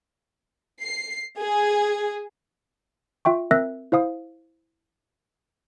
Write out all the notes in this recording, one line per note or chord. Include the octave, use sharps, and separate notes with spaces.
C7
G#4
F4 E5 G5 C#6
C4 A#4 E5 E6 F#6 A#6
E4 C5 F5 D#6